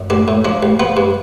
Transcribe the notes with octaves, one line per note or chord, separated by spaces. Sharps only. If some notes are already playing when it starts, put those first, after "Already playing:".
Already playing: F#2
A1 D4
A2
F3 D4
A1
F3 B3
G2